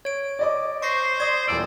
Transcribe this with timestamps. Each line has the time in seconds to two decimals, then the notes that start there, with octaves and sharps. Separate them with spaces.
0.05 C#5 D7
0.39 D5 D#5 D6
0.82 C5 C#6 A#6 C7
1.20 D5 C6 D#6 G#6
1.48 D#1 E2 D5 E6